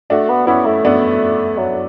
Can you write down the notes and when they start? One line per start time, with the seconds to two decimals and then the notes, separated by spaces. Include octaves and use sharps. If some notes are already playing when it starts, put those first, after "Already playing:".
0.10 A3 D4 F#4
0.29 B3
0.47 B3 C#4 E4
0.65 A3
0.85 B3 D4
1.57 F#3